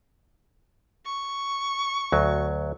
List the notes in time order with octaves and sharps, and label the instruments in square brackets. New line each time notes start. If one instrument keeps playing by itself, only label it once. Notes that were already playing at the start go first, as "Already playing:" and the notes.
[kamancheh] C#6
[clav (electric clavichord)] D2 F#3